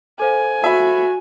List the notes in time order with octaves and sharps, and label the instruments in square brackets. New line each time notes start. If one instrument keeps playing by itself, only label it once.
[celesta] A4 C5 F5 [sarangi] G#5
[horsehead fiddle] F#4 [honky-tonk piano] E5 B5